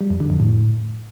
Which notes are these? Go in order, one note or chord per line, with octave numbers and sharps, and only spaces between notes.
G3
F2
D3
F2
A2